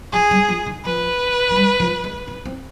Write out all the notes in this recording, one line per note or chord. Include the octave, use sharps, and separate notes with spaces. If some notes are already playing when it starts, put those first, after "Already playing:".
F3 G#4
G3
F3
D#3
F3 B4
F3
G3
F3
G#3
C4
C4